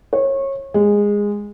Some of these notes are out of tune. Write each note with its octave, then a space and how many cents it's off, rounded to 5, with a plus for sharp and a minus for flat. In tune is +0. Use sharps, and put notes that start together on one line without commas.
C#5 -25
G#3 -15